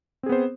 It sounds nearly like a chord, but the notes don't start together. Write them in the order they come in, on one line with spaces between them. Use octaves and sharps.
C4 G#4 B3 C5